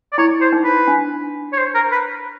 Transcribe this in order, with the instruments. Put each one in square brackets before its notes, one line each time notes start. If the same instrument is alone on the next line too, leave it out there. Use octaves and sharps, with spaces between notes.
[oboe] D5
[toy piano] E4 [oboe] C#5
[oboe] C5
[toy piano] D#4
[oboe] B4
[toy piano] D4
[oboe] C#5
C5
A#4
B4